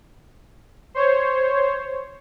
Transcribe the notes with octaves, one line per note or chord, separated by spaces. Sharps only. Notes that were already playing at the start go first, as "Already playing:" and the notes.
C5 C#5